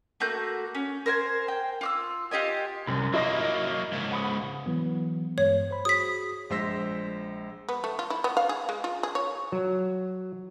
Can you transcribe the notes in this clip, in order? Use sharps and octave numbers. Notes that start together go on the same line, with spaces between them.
A3 A#3 F#4 G6
C#4
A#4 C5 G5 G#5
G5
F4 D6 E6
F4 G4 D#5 G#5
C2 F#2
F#3 A#3 E4 D#5 A#6
G#2 C#3
F#5 B5 D#6
E3 F#3 B3
G2 G#3 C#5
C5 B5
F#4 G#4 D#6 B6
A#1 G#3 C5 E6 A#6 B6
B3
A3
F4
E4
B3
F5
G#4
G#3
F4
G#4
C#5
F#3